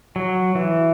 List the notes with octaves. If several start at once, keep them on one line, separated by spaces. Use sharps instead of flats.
F#3
E3